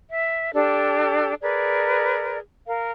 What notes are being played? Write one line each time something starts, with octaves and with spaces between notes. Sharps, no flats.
E5
D4 G4 A4
G#4 A#4 B4 D5
A#4 F5